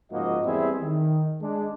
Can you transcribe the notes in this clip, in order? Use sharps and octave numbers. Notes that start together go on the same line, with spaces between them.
G#2 C#3 F3 A#3 F#4 D#5
E2 G3 C4 E4 G#4 E5
D#3
G#3 D4